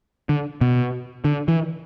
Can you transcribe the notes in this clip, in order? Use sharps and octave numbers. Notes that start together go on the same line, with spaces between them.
D3
B2
D3
E3